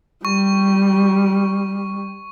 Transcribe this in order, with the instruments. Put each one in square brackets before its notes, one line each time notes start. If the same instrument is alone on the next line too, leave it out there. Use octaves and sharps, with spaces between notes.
[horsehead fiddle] G3 [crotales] C#6